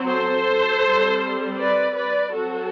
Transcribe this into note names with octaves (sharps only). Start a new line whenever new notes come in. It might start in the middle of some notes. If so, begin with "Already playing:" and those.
Already playing: F#3 C4
A4 C5
G3 C4
B4 D5
B4 D5
F#3 C4 F#4 A4